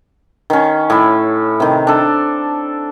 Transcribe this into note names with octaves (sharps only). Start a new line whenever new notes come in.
D#3 C#4
A2 E4
C3 D#3
D4 A4